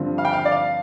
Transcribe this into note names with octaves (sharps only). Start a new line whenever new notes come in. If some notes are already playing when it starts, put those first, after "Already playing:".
Already playing: G2 D3 F3 C4
F5
G5
F5
D5
F5